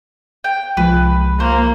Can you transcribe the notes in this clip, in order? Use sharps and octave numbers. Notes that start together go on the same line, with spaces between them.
G5
C2 F3 G#3 B4
A#3 C5